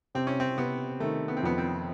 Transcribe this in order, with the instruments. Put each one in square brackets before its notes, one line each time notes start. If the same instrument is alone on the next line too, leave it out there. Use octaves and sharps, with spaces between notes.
[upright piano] C3 [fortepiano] C4
[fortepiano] C#4
C4
[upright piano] C3 [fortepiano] B3
[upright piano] D#3 [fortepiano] A3
[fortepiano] B3
C4
[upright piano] F2 [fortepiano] B3
[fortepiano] C4